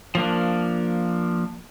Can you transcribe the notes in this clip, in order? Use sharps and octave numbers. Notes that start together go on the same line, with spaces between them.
F3 A#3 D4